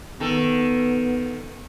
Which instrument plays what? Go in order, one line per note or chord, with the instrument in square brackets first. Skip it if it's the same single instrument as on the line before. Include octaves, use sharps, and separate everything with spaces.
[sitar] D#3 A4 [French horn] B3